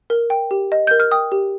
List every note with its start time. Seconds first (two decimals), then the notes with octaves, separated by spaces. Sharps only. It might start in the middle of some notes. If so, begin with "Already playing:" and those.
0.10 A#4
0.30 G5
0.51 G4
0.72 D#5
0.87 A#4 G6
1.00 F6
1.11 G5 D#6
1.32 G4